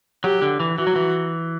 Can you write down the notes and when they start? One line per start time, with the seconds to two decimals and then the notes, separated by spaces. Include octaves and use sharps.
0.24 F#3 G4
0.42 D3
0.60 E3
0.78 E3 F#4
0.87 F#3
0.96 E3